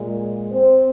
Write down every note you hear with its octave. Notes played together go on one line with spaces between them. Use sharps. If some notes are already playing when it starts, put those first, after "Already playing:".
Already playing: A#2 G#3
C4 C5